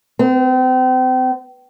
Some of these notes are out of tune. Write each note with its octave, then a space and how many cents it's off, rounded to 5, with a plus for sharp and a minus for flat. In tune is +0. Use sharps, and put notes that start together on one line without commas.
C4 -35